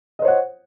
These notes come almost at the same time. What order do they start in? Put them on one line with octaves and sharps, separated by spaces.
D#5 C5 C#5 F#5